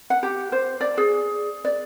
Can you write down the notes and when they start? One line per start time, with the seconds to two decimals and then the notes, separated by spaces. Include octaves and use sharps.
0.10 F#5
0.23 G4
0.52 C5
0.81 D5
0.98 G#4
1.65 D5